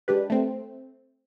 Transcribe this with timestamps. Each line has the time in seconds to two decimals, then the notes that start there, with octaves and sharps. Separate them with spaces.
0.08 G#3 D4 G4 B4
0.30 A3 C4